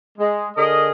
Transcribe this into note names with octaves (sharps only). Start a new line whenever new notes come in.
G#3
D3 G#4 A#4 D#5